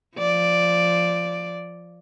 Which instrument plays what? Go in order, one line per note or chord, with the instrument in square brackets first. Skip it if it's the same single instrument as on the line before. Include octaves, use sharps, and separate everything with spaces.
[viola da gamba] F3 D5